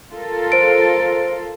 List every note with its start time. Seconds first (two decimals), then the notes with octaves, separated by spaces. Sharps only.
0.12 F4 A4 A#4
0.52 C5 D7